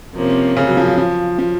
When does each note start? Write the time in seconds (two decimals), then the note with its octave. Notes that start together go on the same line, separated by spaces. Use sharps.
0.16 C3 F3 A#3 C#4
0.57 C#3
0.67 F#3
0.77 F3
0.87 F#3
0.98 F3
1.39 F3